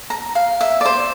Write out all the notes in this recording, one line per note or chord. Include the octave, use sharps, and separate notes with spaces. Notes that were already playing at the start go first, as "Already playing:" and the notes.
A#5
F5
E5
D5
C5